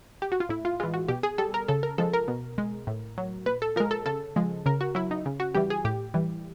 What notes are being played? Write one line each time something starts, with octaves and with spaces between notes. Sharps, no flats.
G4
F#4
F4
A2 E4
F4
E3 G#3 F4
F#4
B2 G4
G#4
G3 A4
A#4
C#3 A4
A#4
F3 G#3 A4
A#4
B2
G#3
A2
F#3
A#2 B4
A4
F3 G#3 A#4
A4
C#3 A4
F3 G#3
C#3 A#4
F#4
F#3 E4
D#4
C#3
F#4
E3 G3 G4
G#4
A2 G4
E3 G3